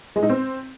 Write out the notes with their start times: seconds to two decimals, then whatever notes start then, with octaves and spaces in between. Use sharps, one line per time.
0.16 G#3
0.23 D#4
0.29 C4